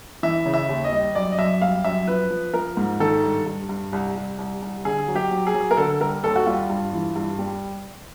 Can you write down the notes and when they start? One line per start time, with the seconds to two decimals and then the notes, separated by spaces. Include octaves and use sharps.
0.23 E3 E5
0.46 C#3
0.54 E5
0.69 D#2
0.84 D#5
0.92 G3
1.15 F#2 D5
1.32 D#5
1.39 F#2 E5
1.62 G3 F5
1.84 F#2 E5
2.08 F3 B4
2.31 F3
2.54 F3 A#4
2.77 G#2
3.00 D#3 A4
3.23 G2
3.46 G2
3.69 G2
3.93 C2
4.16 C2
4.39 C2
4.62 C2
4.85 D3 G#4
5.08 F#3
5.16 G4
5.31 F#3
5.47 G#4
5.54 F#3
5.71 A#4
5.77 D3 A4
6.00 G3 A#4
6.24 D#2 A4
6.36 F#4
6.46 G3 F4
6.70 G2
6.93 E3
7.16 G2
7.39 G3